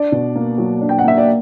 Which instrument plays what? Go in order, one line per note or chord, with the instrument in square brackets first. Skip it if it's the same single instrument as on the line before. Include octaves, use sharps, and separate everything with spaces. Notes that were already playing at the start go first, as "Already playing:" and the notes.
Already playing: [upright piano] D4 D5
B2
A#3
F#3
D4
G5
F#5
A#3 E5
D5